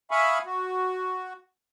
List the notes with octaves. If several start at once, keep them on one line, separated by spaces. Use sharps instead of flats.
E5 F5 G#5 B5 C#6 D#6
F#4